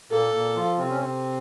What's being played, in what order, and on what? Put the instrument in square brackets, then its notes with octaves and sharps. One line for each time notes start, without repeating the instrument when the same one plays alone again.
[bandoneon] A#2 A#3 [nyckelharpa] A4
[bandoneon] A#2 A#3
F3 F4
C3 C4
C#4
C3 C4